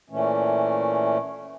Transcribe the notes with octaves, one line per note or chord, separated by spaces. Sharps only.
A#2 E3 A3 C#4